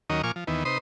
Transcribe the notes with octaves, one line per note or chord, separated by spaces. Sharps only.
D#2 D#3 F#3 C#4 A#4 D#5
A#2 F3 G#5 C#6 D6 F6
F3
D#2 D#3 E3 B3
C3 D#4 B4 C5 C6 D#6